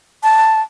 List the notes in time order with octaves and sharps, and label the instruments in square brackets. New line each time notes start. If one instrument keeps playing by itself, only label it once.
[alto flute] A5